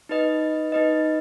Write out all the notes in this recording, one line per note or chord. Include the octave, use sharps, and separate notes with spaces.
D#4 B4 D#5
D#4 B4 D#5